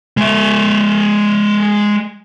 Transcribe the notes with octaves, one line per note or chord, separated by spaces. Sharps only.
G#3 E5